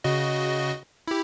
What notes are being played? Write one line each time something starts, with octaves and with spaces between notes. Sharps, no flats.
C#3 F#4 D#5
E4 G4